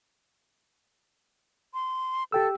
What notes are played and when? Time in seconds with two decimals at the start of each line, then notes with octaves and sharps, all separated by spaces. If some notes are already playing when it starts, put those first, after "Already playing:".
1.74 C6
2.32 G4 A4 G5 E6